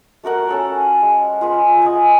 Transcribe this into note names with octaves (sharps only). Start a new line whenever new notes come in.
A3 F#4 A#4 F#5
C#4 A4 C#5
G#3
F4 G#4 B4 G#5
D#5 F5 F#5 G#5